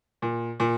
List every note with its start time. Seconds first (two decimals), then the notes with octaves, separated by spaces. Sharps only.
0.22 A#2
0.60 A#2